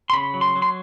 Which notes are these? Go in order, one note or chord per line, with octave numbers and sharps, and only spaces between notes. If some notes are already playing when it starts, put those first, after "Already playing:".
C6
C#3 B5
F#3
C6
F#3
C6